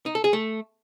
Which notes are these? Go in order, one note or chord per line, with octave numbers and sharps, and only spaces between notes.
D#4
A4
G#4
A3